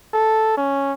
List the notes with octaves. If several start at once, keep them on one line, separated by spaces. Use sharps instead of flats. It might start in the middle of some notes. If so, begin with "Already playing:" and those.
A4
C#4